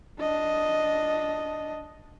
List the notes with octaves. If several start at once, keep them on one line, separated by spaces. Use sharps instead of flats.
D4 D#5